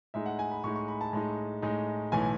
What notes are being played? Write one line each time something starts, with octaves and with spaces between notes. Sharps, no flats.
A2 G#3 D#4 E5
F#5
G#5
B5
A2 G#3 D#4 C#6
C#6
B5
A5
A2 G#3 D#4
A2 G#3 D#4
B1 A2 E3 G#5